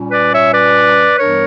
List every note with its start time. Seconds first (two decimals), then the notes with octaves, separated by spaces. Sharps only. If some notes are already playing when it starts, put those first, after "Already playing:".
Already playing: A#2 G3 C#4
0.11 B4 D5
0.32 C#5 E5
0.53 B4 D5
1.18 G2 E3 G3 B3 D4 A#4 C#5